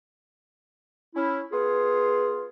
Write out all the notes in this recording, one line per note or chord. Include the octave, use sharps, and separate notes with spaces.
C#4 E4
B3 F4 G#4